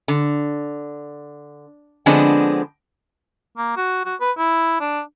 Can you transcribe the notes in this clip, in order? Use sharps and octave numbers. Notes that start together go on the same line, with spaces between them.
D3
D3 F3 G#3 B3 C4 D4
A#3
F#4
F#4
B4
E4
D4